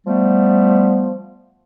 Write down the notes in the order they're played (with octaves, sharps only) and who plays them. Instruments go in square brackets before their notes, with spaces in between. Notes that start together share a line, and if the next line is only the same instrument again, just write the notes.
[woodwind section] F3 G3 A3 B3